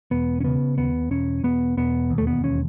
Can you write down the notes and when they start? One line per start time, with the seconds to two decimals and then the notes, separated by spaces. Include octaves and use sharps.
0.11 E1 B3
0.40 C#4
0.44 C#3 B3
0.78 D#2 B3
1.11 E1 C#4
1.44 E1 B3
1.77 E1 B3
2.10 D#2
2.18 A3
2.27 B3
2.43 E1 C#4